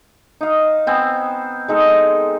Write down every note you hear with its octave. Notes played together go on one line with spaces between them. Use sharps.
D#4 F5
B3 C4 G#5
G#3 D#4 A4